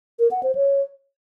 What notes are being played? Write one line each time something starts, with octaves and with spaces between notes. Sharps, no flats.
A#4
F#5
C5
C#5